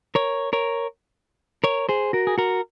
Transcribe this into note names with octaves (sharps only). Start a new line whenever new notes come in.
A#4 C#5
A#4 C#5
A#4 C#5
G#4 C5
F#4 A#4
G#4
F#4 A#4